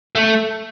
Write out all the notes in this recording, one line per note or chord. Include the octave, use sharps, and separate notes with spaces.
A3